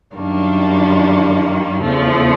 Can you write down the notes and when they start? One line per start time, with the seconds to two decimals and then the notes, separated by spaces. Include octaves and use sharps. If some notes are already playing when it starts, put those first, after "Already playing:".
0.15 F#2 D#3 G3 A#3 D4
1.81 E2 C#3 F3 A3